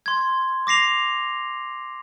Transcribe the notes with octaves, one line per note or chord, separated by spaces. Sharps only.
C6 G#6
D6 A#6 C7 F7